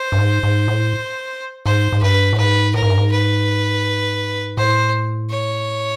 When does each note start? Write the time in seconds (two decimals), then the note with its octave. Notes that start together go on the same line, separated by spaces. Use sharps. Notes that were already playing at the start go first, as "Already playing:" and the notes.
Already playing: C5
0.12 G2
0.18 G#2
0.43 G#2
0.68 A2
1.66 G#2 C5
1.92 G#2
2.02 G2 B4
2.33 A2
2.38 G#2 B4
2.74 A2 A#4
2.82 G#2
2.90 G2
2.98 G#2
3.12 B4
4.57 A2 C5
5.31 C#5